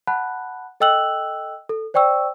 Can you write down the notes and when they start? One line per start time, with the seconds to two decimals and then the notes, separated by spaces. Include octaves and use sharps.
0.07 F#5 A5 B5 F#6
0.80 A4 D#5 G5 E6 F#6 F#7
1.69 A4
1.94 C5 D5 G5 C#6 E6